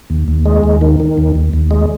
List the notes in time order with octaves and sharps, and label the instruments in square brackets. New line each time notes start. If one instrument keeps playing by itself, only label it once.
[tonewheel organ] D#2
D#2
G#3
D#2
D#3
D#3
D#2
D#2
D#2
G#3